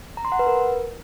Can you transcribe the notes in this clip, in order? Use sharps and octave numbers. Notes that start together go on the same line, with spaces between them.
A#5
C6
F#5
B4
A#4